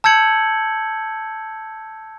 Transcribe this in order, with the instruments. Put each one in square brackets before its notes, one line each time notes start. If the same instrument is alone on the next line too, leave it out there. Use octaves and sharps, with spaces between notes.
[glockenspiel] A5 E6 G6 G#6 C#7 F#7